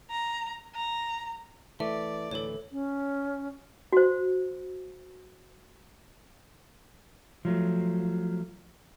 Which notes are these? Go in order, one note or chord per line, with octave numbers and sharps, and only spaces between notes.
A#5
A#5
E3 A3 D5 E5
D2 A2 E3 A4 C#5
C#4
F#4 C5
F3 F#3 A3